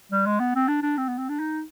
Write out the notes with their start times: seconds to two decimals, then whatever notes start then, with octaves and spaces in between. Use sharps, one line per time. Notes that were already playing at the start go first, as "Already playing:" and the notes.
0.12 G3
0.26 G#3
0.40 B3
0.55 C4
0.68 D4
0.82 D4
0.98 C4
1.08 B3
1.18 C4
1.29 D4
1.40 D#4